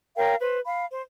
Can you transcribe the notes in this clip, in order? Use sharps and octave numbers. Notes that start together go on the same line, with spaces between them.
A#4 C#5 F5 G5
B4 C5
F5 B5
C5